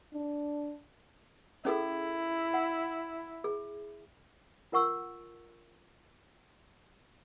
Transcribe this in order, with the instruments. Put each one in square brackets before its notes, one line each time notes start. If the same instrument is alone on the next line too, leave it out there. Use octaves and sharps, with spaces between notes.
[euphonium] D4
[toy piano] C#4 G#4 A4 [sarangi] E4
[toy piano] F#5
G#4
F4 A#4 F#5 C#6 E6